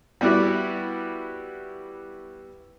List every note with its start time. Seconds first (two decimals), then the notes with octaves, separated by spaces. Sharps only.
0.21 G3 B3 E4 F#4 D5